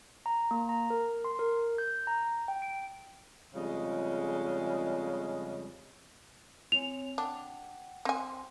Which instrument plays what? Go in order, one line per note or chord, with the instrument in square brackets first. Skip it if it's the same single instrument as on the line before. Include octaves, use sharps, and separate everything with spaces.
[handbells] A#5
A#3
A#5
A#4
C6
A#4
G6
A#5
G5
D7
[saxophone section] F2 C#3 G3 G#3 D#5
[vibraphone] C4 C#5 G#5 [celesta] F7
[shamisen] D4 [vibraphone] F#5 G5
[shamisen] C4 G#5 [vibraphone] G5 C6